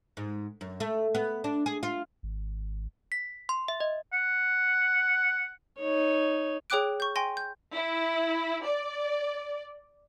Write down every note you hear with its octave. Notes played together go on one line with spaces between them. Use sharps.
G#2
F#2
A3
B3
D4
G#4
F4
G#1
B6
C6
E5
D#5
F#5
D#4 C#5
G#4 C#5 G5 D6 F#6 D7
C#6 G6
G5 G#5 C6 A#6
G6
E4
D5